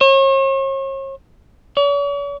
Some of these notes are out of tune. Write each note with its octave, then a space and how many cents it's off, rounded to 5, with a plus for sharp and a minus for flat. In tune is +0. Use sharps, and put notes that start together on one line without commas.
C#5 -40
C#5 +45